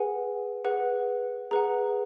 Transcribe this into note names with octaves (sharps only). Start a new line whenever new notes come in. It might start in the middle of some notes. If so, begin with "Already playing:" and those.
Already playing: G#4 B4 F#5 G#5
G#4 B4 F#5
G#4 B4 F#5 A#5